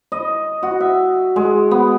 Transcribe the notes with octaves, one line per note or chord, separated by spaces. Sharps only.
D#5
F#4
E5
G#3
B3